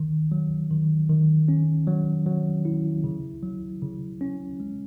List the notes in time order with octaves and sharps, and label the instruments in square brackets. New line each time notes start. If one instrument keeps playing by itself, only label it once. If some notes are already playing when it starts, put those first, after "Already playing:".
Already playing: [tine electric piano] D#3
F#3
D#3
D#3
C#4
F#3
F#3
E4
C#3
F#3
C#3
C#4
G#3